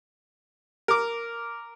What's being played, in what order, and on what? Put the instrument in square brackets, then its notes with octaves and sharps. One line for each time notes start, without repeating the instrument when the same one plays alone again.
[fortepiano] A#4 D6